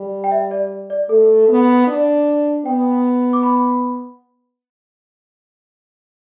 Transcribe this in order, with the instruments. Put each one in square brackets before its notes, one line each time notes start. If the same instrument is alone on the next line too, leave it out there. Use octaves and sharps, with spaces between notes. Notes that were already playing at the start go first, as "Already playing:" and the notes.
Already playing: [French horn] G3
[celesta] G5
E5
D5
D5
[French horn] A3 [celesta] A4
[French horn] B3
D4
[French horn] B3 [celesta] G5
[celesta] D6
B5